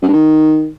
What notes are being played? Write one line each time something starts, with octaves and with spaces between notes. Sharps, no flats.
F#2
G2
D#3